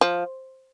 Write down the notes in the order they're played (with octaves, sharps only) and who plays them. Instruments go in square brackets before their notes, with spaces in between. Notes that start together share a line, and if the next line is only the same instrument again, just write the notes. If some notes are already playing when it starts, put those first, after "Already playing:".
[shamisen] F3